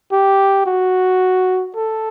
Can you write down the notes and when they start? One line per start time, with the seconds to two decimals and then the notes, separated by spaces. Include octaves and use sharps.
0.12 G4
0.66 F#4
1.76 A4